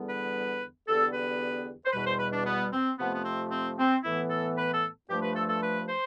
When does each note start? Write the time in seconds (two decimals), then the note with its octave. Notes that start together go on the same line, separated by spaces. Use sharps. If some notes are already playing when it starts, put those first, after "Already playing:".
Already playing: E2 D3 G3 B3
0.10 B4
0.88 E2 D3 G3 B3 A4
1.14 B4
1.85 C5
1.93 E2 B2 G3 B4
2.07 C5
2.20 B4
2.33 D4
2.46 B3
2.73 C4
2.98 F2 C3 F3 A3 B3
3.15 B3
3.25 C4
3.52 C4
3.78 C4
4.04 A2 E3 B3 E4
4.30 A4
4.57 B4
4.74 A4
5.09 G2 F3 A3 G4
5.22 B4
5.36 A4
5.49 A4
5.63 B4
5.89 C5